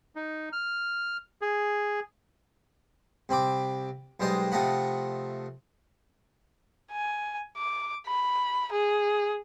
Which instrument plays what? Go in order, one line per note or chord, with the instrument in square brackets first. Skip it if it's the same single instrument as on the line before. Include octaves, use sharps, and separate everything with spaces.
[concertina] D#4
F6
G#4
[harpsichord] C2 C4 B5 D6
B1 G3 G#3 C5 D#5
C3 F3 A3 D#5 F#5 B5
[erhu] G#5
D6
B5
G#4